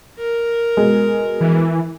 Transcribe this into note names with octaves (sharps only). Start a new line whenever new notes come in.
A#4
B2 G#3
E3